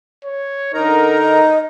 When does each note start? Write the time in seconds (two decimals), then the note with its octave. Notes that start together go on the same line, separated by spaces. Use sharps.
0.25 C#5
0.74 D3 D#4 A#4 A#5
1.18 D#5